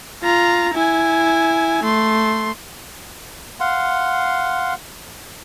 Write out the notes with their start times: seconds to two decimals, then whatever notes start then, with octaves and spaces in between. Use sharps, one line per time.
0.23 F4 A#5
0.75 E4 G#5
1.84 A3 C6
3.60 F5 F#5 C6